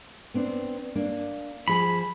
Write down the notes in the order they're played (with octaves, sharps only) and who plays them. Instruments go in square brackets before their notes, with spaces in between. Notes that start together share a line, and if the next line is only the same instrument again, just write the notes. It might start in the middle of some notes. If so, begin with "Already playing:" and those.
[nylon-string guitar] B3 C4 D4
A#3 D4
[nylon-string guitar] F3 G#4 [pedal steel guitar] B5